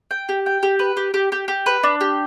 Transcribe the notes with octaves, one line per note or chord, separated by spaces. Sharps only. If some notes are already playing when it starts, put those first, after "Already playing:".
G5
G4
G5
G4
B4
G4
G4
G4
G4
B4
D4
G4